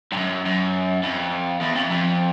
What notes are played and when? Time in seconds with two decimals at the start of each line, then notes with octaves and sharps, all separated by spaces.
0.12 G2
0.17 F#2
0.46 F#2
1.03 F2
1.61 E2
1.76 F2
1.91 F2